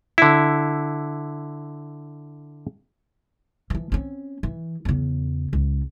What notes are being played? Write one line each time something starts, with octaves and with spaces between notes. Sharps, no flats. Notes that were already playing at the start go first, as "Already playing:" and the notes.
D3 E4
E3 F3
C4 C#4
E3
E2 C#3
C#2